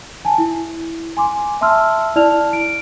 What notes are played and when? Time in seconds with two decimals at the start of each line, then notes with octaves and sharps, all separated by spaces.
0.25 G#5 A5
0.38 E4
1.17 G#5 C6 D6
1.61 E5 A5 C6 E6 F6
2.15 E4 D5 A5 F6 F7
2.53 D7